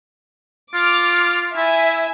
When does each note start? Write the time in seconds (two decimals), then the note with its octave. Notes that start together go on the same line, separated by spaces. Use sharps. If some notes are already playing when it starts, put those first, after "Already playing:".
0.74 F4 D6 F6
1.56 E4 E5 G#5